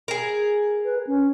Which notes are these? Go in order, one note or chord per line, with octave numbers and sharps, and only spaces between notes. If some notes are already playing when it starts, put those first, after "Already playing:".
G#4 A#4
B4
C#4